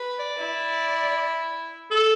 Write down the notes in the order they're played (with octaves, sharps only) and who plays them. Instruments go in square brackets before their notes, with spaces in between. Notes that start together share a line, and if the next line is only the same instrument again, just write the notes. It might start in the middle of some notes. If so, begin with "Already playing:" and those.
Already playing: [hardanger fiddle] B4
[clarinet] D5
[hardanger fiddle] E4
[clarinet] A4